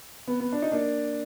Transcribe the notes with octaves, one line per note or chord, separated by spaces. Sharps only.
B3
B3
D4
D#4
A#3 D4